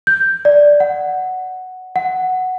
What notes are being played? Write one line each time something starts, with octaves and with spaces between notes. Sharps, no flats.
G6
D5
F#5
F#5